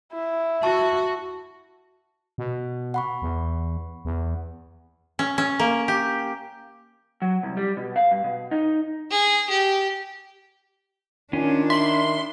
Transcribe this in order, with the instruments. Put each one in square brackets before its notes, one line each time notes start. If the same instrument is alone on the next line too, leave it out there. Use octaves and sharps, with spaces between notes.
[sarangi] E4
[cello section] F#4 [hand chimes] A5 C#6
[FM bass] B2
[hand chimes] F#5 B5 C#6
[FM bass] E2
E2
[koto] C#4
C#4
A#3
G4
[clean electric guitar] F#3
C2
G3
B2
F5
G2
B2
D#4
[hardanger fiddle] G#4
G4
[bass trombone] D#3 [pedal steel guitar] C#4 F4 G#5 [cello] D4
[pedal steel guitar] E5 B5 [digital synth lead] C6